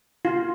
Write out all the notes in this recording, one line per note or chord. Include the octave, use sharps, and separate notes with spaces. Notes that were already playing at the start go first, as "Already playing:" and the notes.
F4